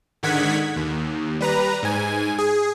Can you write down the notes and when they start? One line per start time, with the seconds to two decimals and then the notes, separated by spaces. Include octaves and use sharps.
0.23 G#2 D3 D#3 F#5 G#6 B6
0.76 D#2
1.41 G3 B4 A#5
1.83 G#2 G#5
2.38 G#4